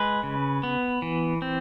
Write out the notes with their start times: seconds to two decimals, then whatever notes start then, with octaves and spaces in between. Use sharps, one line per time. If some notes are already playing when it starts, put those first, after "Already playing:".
Already playing: G#3 B4
0.23 C#3
0.63 B3
1.02 E3
1.42 C4